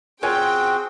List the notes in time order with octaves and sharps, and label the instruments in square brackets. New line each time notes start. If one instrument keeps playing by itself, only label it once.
[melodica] C4 F#4 [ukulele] F4 C#5 G#5 [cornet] G#4 [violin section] G5